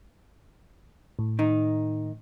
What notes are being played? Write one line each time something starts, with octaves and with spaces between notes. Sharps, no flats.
A2
D#3 D#4